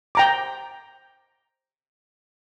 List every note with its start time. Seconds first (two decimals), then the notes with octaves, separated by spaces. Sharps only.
0.15 G5 A#5 D6